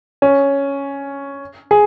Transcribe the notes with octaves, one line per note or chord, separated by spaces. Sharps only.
C#4
G#4